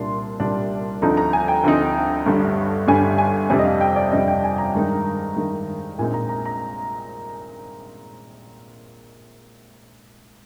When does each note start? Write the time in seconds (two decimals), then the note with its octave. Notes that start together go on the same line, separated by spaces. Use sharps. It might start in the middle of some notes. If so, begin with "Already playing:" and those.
Already playing: C2 A#2 G3 D4 C6
0.40 C2 A#2 G3 D4
1.02 D2 D3 F3 C4 D#4 A#5
1.17 A#5
1.33 G#5
1.48 G5
1.64 D2 D3 F3 C4 D#4
2.26 G1 G2 D3 G3
2.88 G1 G2 D3 G3 G#5
3.18 G#5
3.50 F2 C3 G3 D4 G#5
3.59 D#5
3.65 F5
3.81 G5
3.96 D5
4.12 F2 C3 G3 D4 D#5
4.28 G5
4.44 G#5
4.58 A#5
4.75 G2 D#3 G#3 D#4
5.36 G2 D#3 G#3 D#4
5.98 A#1 A#2 G#3 C4 D#4 G#5
6.13 A#5
6.29 A#5
6.45 A#5